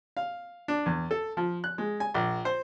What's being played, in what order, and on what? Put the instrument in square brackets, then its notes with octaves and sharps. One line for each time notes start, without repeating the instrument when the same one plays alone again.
[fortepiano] F5
D4
E2
A4
F3
F#6
G#3
G#5
A#1
C5